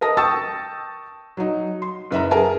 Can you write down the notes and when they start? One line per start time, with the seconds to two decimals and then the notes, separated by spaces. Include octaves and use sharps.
0.01 A#4 D#5 A5 D#6 A#6
0.17 G5 A5 C#6 D#6 E6 A6
1.37 F#3 D#4
1.82 C6
2.11 F#1 B4 E5 A#5
2.31 G#4 A#4 G#5 A5